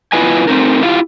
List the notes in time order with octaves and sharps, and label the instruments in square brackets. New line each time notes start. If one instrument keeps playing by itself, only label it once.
[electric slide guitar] B3 E4 F4 B4 D#5 G#5
A3 C4 D#4 A#4
E4 F4 G4 F5